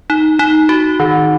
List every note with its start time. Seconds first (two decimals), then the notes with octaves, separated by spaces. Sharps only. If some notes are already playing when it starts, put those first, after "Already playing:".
0.10 D#4
0.39 D#4
0.69 F#4
1.00 D#3